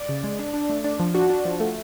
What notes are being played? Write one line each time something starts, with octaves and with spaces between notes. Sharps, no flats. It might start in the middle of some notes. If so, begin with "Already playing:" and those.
Already playing: D5
C#3
G#3
D4
D4
A3
D4
F3
D4 F#4
D4
F3
A3